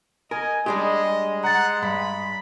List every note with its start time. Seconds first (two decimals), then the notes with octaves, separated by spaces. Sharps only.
0.31 A#4 D#5 G#5
0.66 G3 G#3 D4 G4 D#5
1.10 G#3
1.44 F#5 A#5 A6
1.82 G2 B5